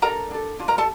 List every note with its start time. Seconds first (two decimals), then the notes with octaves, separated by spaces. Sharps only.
0.02 D4 A4 A#4 A#5
0.31 D4 A4
0.59 D4 F4
0.68 A#4 A#5
0.78 A4 A5